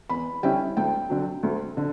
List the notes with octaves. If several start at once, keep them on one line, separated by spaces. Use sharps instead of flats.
E2 B5
D3 G3 C#4 E4 G5
D2 G5
D3 F#3
D2
D3